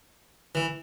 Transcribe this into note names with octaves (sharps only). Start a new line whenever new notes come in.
E3